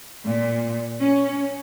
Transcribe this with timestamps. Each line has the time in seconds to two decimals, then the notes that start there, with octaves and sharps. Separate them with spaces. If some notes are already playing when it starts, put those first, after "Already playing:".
0.25 A#2
1.00 C#4